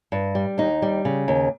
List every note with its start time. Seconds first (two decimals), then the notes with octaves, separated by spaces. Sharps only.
0.12 G2
0.35 G3
0.58 D#2 D#4
0.82 G3
1.05 C#3
1.28 D#2